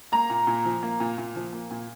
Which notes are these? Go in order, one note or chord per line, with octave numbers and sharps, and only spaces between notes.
A#3 A#5
A#2
A#2
F3
A#3
A#2
A#2
F3
A#3
A#2